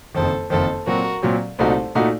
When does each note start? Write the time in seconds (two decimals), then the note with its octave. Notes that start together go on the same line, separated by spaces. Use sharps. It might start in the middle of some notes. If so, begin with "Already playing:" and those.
0.14 F#1 F2 D#3 A4 C5
0.50 F#1 F2 D#3 A4 C5
0.86 A#2 F#3 C4 F#4 A#4
1.22 A#2 F#3 C4
1.58 C2 A#2 A3 D#4 F#4 A4 C5
1.95 A#2 A3 D#4 F#4